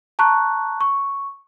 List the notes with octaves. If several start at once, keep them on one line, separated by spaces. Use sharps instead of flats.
A5 A#5 C#6 F#6
C#6